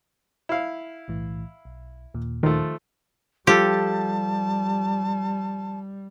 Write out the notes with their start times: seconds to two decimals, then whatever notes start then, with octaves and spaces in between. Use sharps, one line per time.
0.49 E4 F5
1.08 B1 A2 E3
1.65 B1
2.14 D#2 A#2
2.43 D#3 F3 A3
3.47 F3 G3 G4 A4 A5